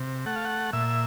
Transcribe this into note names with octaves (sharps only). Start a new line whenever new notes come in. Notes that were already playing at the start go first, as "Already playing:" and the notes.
Already playing: C3
A3 F#5
F5
F#5
A#2 E5